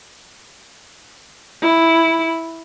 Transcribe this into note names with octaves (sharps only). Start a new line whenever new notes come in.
E4